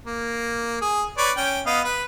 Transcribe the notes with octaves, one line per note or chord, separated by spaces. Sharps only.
A#3
G#4
B4 C#5 D5
C#4 G5
B3 D#5 F5
B4